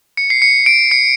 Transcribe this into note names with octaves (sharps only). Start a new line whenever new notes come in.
C#7
C7
C#7
D7
C#7